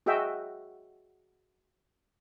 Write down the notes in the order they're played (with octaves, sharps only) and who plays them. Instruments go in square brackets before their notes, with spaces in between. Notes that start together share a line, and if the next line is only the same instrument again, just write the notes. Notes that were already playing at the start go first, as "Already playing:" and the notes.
[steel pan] F#4 G#4 D#5 E5 G5